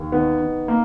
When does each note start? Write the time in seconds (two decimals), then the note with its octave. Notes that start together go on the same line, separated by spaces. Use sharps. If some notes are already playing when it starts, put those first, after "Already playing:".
Already playing: D#2
0.12 D#3 B3
0.40 D#3
0.68 A#3